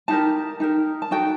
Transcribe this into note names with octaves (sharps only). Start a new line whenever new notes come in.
D#4 G4 A#4 A5
D#4 G4 A#4
A5
D#4 F#4 A4 G5